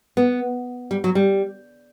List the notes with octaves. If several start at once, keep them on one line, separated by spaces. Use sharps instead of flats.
B3
G3
F#3
G3